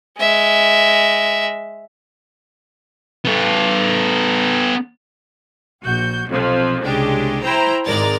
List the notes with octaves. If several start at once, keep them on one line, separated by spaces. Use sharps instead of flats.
G#3 E5
B3 A4
A#1 F#4 G6
B1 F2 C3 F3
C2 C#3 G#3 D4 G4
E4 C5 G5 A#5 B5
G#1 G#3 A#4 D5 A#5 A6